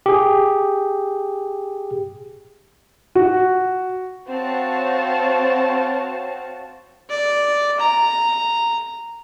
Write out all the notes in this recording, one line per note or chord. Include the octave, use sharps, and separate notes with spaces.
G4 G#4
F#4
C4 F#4 C#5 F5 A5
D5
A#5